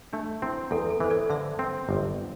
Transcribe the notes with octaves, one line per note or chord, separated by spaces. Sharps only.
A3 D4
C4 E4
E2 A4
A4
E3 C5
A4 D5
D3 C5 E5
C4
G1